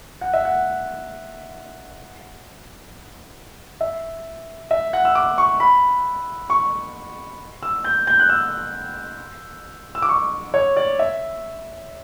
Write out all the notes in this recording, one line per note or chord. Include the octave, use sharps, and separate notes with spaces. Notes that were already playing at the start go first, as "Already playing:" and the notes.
F#5
E5
F#5
E5
E5
F#5
E6
D6
C#6
B5
C#6
E6
G6
G6
F#6
E6
E6
D6
C#6
C#5
D5
E5